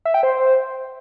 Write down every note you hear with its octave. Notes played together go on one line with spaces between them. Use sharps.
E5
G5
C5